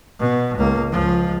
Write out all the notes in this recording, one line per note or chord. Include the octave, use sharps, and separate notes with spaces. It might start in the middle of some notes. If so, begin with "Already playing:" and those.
B2
C#2 A#3
C#2 F3